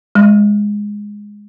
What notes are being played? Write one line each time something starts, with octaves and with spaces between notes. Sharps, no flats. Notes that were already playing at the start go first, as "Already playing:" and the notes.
G#3